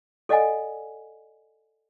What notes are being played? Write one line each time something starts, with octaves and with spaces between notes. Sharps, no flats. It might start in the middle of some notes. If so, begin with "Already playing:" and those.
A4 D5 D#5 F#5 G#5